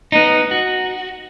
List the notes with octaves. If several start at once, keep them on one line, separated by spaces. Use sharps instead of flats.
B3 D#4
F#4